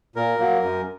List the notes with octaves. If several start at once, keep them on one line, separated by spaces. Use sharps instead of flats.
A#2 A#4
F#3 A#3
F#2